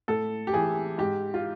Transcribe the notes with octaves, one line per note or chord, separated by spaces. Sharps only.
A2 A4
G4
E3 G#4
G#2 G4
F4